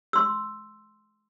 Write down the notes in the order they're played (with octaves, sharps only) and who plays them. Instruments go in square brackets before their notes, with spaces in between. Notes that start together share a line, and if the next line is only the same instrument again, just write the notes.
[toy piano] C6 E6